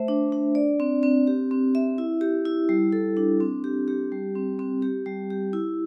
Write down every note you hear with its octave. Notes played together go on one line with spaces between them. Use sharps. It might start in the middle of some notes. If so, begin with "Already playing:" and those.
Already playing: A3 C5 E5
D4
D4
D5
C4
C4
G4
C4
E5
E4
G4
E4
G3
A4
D4
C4
G4
G4
G3
C4
C4
G4
G3
G4
E4